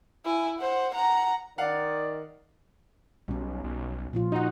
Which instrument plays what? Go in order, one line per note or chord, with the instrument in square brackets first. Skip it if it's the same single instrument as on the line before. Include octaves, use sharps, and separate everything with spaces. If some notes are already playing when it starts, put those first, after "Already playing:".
[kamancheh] E4 G#5
C5 F#5
F#5 A#5
[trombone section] D#3 [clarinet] D5 [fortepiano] F5 F#5
[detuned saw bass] B1 [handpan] G3 C#4
[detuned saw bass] B1
[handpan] A#2 F3 F4
[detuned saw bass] D#4 [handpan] F#4 F#5